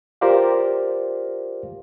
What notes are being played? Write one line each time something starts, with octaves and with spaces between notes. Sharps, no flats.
F4 G4 A#4 C5 D5 F5